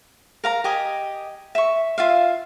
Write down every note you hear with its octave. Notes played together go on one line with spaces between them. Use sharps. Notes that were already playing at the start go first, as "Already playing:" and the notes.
A#4 F5 A#5
G4 D#5 G#5
E5 C#6
F4 E5 F5